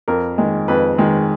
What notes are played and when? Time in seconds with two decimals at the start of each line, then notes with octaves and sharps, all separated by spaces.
0.08 F2 A#4
0.38 D#3 G#3
0.68 F2 B4
0.98 D#3 G#3